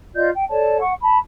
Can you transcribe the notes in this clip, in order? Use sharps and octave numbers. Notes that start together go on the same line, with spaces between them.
F4 D5 D#5 G6
G5
A4 C#5 D5 A5
F#5 C#6
A5 B5